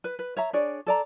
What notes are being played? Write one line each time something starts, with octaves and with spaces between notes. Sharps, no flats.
B4
B4
C#5 E5 A#5
D4 G#4 C#5 D5
A4 D5 A#5